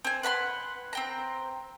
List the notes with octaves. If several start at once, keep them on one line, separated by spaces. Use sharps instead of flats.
C4 G#5
B4 F#5 B5 C6
C4 G5 A#5